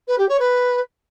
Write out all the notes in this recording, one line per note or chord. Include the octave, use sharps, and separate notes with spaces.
B4
G4
C#5
B4